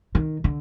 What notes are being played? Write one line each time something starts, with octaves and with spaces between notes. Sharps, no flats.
D#3
D3